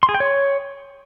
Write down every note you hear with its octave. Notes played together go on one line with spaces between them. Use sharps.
C6
G#4
G5
C#5